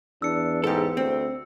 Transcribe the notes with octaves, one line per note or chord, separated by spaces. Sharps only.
E2 D4 E6 C#7
G#2 G4 A4
D2 C4